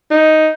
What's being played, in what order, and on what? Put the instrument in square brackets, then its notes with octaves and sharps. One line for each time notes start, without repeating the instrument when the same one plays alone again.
[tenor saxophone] D#4